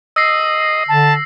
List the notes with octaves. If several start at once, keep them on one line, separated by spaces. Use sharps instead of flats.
D#5 E6 A#6 C7
D3 A5